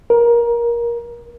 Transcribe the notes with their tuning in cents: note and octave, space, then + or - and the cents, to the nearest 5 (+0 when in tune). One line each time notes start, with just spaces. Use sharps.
A#4 +20